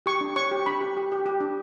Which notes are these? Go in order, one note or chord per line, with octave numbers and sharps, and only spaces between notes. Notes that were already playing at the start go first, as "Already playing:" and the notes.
G4 C#6
D4
C#5 C#6
G4
D4 B5
G4
G4
G4
G4
D4